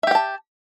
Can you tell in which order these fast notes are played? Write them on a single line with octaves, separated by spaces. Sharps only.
E5 G4 G5 A5